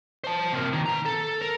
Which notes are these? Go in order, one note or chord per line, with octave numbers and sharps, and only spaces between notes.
C5 A5
C3 A#3
D#3
B4 A#5
A4
A#4